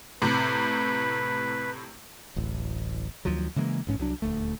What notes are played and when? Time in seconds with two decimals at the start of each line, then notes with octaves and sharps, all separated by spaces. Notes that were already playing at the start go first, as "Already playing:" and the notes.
0.22 A2 C3 B4
2.36 D1 A1
3.25 D2 D#3 F3 F#3
3.56 C#3 E3 G#3 A#3
3.87 A1 G#2 C#4
3.99 C2 F#3 D4
4.22 D#1 D2 A3